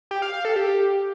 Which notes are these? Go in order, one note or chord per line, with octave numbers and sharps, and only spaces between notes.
G4
F5
F5
A4
G4